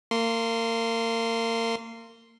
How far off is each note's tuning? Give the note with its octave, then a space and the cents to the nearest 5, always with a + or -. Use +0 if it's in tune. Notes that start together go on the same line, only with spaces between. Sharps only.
A#3 -30 C6 +0